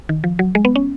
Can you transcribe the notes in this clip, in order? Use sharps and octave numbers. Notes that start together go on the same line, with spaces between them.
D#3
F3
F#3
G#3
B3
C#4